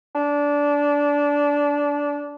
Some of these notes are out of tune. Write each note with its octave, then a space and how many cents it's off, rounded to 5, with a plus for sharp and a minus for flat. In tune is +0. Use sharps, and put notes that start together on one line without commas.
D4 -20